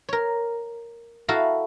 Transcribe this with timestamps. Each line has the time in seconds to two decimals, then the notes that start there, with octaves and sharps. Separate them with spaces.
0.09 A#4 C#5
1.28 E4 F#4 A4 F5 A#5